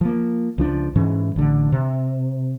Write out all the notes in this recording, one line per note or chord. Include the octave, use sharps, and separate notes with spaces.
F3 A#3
C#2 F3 D4
G#2 E3 C#4
A1 D3
C3